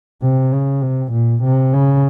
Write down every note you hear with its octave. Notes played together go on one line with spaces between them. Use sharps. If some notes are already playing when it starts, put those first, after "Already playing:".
C3
C#3
C3
A#2
C3
C#3